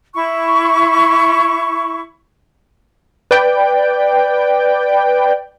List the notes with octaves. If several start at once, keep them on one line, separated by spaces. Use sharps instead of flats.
E4 C#6
B4 D5 G5